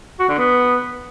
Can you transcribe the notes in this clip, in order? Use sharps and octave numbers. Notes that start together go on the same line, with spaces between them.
F#4
D3
B3